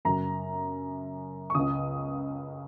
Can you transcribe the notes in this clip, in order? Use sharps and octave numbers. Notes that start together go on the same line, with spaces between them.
F#2 C#3 A#5
C#6
C#2 C#3 D#6